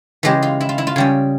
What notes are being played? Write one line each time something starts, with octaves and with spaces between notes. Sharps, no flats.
C#3 E3 G#3 G4
F4
E4
F4
E4
F4
C#3 G3 C#4